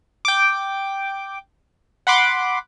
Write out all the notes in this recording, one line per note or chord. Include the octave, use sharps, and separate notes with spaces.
G5 D6
F#5 B5 C6 D6